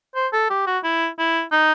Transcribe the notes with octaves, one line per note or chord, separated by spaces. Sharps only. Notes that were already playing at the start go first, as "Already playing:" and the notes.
C5
A4
G4
F#4
E4
E4
D#4